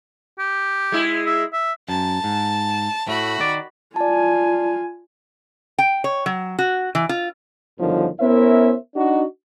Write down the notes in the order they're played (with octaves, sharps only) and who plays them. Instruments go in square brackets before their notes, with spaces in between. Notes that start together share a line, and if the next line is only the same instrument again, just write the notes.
[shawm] G4
[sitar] G#3 E4
[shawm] E5
E5
[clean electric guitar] F#2 [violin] A5
[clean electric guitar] G#2
[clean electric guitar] A2 A3 [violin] F#4 B5
[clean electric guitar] D#3 D5
[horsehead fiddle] F4 G#5 [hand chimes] D5 A5
[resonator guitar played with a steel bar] G5
C#5
F#3
F#4
E3
F4
[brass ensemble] G1 F#2 D3 D#3 F3
B3 C#4 E4 A#4 C5 E5
D4 D#4 F#4